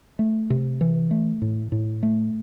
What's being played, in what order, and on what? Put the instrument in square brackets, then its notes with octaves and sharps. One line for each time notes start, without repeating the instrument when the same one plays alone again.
[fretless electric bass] A3
C3
E3
A3
A2
A2
A3